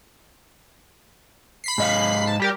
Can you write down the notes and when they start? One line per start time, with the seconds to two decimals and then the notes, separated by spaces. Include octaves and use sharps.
1.64 B5 B6 C7
1.78 G#2 D#5 F5
2.27 A5
2.40 G3 G4 A#4